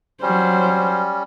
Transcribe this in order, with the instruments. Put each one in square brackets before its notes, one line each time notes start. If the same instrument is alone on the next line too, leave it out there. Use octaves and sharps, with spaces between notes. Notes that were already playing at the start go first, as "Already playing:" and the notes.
[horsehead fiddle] F#3 C5 [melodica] G3 C#4